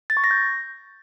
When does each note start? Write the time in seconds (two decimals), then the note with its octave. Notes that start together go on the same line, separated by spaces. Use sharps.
0.10 A6
0.17 C#6
0.24 A#6
0.31 G6